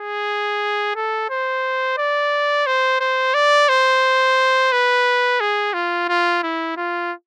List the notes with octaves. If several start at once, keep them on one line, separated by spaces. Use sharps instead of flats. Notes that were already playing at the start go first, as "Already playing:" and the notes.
Already playing: G#4
A4
C5
D5
C5
C5
D5
C5
B4
G#4
F4
F4
E4
F4